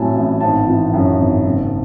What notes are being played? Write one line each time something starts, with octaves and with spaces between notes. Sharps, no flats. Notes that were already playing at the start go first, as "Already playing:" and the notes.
Already playing: A1 A2 F#3 G#5 A5
A1
G#1 A5
E3
F#2
G#1
F#1